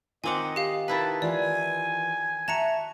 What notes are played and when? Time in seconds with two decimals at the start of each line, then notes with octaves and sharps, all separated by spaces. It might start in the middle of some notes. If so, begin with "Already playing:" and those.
0.24 D#3 C4 F4 D#5 F#5 G#5 D6
0.56 G4 F5
0.88 D#3 E4 B4 A5
1.22 E3 F4 D5 F#5 G#5
2.48 F#4 E5 A5 A#5 C#7